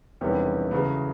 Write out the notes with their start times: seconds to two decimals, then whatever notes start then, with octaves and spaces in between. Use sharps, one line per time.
0.21 E1 E2 C3 D#3 G3 B3 C#4
0.71 E2 C#3 F#3 A3 B3